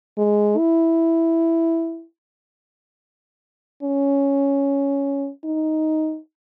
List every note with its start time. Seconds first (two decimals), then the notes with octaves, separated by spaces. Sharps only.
0.18 G#3
0.58 E4
3.83 C#4
5.45 D#4